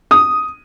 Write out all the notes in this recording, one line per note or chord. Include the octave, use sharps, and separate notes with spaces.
D#6